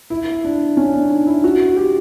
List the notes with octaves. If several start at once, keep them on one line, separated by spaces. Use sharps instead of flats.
E4
D4
C#4
D4
D#4
E4
F#4
F#4
G4